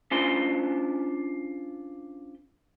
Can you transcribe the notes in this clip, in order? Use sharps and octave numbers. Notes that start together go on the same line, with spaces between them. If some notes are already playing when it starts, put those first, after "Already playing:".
C#4 D4 F4 C5 C6